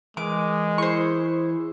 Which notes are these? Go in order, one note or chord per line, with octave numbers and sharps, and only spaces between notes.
E3 G#3 A#4 B4 D6
E4 G#4 C5 C#6